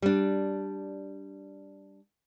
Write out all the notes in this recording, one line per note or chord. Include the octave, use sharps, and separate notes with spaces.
G3 D4